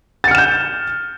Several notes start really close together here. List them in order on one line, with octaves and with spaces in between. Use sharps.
A6 C#7 F6 E7 G6